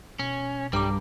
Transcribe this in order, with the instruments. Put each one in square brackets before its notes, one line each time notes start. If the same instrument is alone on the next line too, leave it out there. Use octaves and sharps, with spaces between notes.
[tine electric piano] B2 [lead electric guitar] C#4
[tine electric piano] B1 A#5 D6 [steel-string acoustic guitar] G2 [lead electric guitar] G3